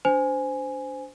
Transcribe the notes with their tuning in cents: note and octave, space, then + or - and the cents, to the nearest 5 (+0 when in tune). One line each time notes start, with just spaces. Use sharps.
D4 -20 C5 -15 G#5 +0